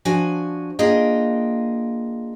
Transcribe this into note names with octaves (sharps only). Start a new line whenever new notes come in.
F3 D4 F#4 G#5
A#3 D4 F4 G#4 D#5 G5